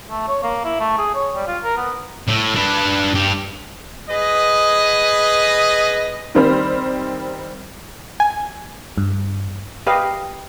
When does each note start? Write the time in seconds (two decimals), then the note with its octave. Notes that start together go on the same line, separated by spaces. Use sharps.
0.10 A3
0.28 C#5
0.43 A#3
0.65 E4
0.80 A3
0.98 G#4
1.14 C#5
1.35 G3
1.47 F4
1.64 A#4
1.77 B3
2.28 A2
2.56 D4 B4
3.14 G2 G4
4.09 G#4 B4 D#5
6.35 D#3 G3 C4 C5 B5 F6
8.20 G#5
8.98 G2
9.87 G4 B4 D#5 F5